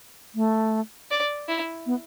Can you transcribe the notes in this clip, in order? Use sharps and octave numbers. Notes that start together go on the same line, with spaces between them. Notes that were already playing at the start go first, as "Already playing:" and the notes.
A3
D5
E4
B3